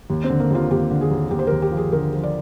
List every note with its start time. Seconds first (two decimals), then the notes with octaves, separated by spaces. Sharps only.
0.10 D#2
0.24 C4
0.30 D3
0.40 A#3
0.50 D#2 F4
0.71 D#2 G4
0.91 D3
1.01 G#4
1.11 D#2
1.31 D#2 G4
1.39 C5
1.47 D#2 A#4
1.62 G4
1.72 F3
1.77 G#4
1.92 D3 A#4
2.13 F3
2.24 D5